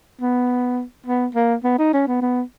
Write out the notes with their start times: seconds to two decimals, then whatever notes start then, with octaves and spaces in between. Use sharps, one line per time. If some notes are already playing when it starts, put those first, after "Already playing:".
0.21 B3
1.07 B3
1.35 A#3
1.64 B3
1.79 D#4
1.94 C#4
2.08 B3
2.22 B3